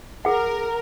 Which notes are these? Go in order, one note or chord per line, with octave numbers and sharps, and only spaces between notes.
G#4 A#4 F#5